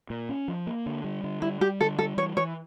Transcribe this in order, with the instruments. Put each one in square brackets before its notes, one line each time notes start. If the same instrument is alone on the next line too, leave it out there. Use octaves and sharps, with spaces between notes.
[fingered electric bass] A#2
C#4
F3
A#3
D3
G3
D3
[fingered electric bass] G3 [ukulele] E4
[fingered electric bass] G3 [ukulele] G4
[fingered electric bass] D3 [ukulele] A4
[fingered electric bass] G3 [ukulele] A4
[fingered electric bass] E3 [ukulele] C#5
[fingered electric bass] E3 [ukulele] C#5